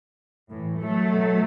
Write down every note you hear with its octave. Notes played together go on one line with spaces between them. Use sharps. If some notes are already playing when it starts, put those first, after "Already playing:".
A2 E3
F#3 A3
B2